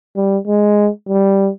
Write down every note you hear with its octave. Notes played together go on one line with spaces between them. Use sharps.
G3
G#3
G3